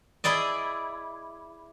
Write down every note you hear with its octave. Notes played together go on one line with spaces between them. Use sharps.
E4 G#4 D5 D#5